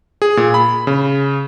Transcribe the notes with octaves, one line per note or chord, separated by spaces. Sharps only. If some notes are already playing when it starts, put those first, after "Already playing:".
G#4
A#2
B5
C#3